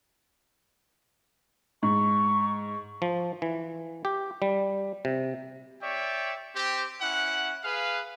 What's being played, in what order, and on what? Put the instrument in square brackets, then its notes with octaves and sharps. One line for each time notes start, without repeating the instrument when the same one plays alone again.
[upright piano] G#2 [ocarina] C#6
[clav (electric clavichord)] F3
E3
G4
G3
C3
[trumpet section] C#5 D5 E5 G5
C4 G4
C#4 E4 F#5
G#4 B4 F5